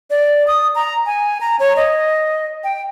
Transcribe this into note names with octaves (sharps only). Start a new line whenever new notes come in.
D5
D#6
A#5
G#5
A#5
C#5
D#5
G5